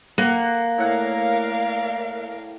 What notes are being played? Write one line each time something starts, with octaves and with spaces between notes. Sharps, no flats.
A#3 F#5
A2 A#4 D5 F5 F#5